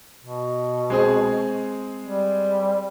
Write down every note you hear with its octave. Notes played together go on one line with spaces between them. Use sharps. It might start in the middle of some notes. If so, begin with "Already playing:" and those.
B2
G#3 C4 G#4
G3